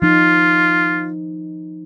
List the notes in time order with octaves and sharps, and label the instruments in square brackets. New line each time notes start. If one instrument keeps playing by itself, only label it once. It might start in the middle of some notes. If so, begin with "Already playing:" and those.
[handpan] F3 D#4 [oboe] F4